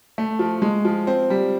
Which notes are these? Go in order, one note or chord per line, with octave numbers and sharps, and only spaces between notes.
A3
F3
G#3
F3
C4
G3